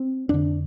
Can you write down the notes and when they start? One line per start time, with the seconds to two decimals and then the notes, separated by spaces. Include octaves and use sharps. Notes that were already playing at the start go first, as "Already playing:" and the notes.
Already playing: C4
0.29 F2 D3 D4